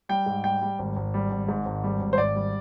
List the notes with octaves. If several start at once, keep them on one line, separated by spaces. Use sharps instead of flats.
G3 G5
G#2
G3 G5
G3
G#1
G#1
G3
G#1
G#2
G#1
G3
G#1
C5
G#1 D5
G3